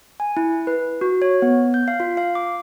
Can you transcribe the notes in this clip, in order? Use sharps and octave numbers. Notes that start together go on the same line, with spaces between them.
G#5
E4
B4
F#4
C#5
B3
G6
F5
F4
F5
D6